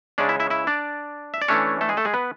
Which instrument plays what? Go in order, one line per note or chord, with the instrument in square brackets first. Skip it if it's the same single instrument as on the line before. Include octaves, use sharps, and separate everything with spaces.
[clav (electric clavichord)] C#3 G#3 C#4 D4 D5
E4 E5
E4 E5
E4 E5
D4 D5
E5
D5
E3 A3 C#4 D4 C#5
A3 A4
G#3 G#4
A3 A4
G#3 G#4
B3 B4